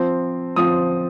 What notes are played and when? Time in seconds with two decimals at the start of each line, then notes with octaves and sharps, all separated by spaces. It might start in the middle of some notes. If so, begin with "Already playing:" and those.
Already playing: F3 C4
0.56 F3 C4 D#6